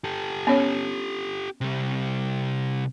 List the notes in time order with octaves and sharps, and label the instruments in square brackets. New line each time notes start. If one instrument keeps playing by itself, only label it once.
[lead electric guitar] G4 A4
[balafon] B3 C#4 C#5
[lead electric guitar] C3 G3